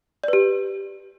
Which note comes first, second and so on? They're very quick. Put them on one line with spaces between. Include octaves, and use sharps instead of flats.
D5 B4 G4